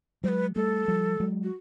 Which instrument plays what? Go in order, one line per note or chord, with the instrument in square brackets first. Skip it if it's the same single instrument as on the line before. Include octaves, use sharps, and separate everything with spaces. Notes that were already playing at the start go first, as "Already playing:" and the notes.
[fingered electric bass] F#3 G#3 [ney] B4 C5
[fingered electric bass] G3 A3 [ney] A4
[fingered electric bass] F3 G3
F#3 G#3
[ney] F#4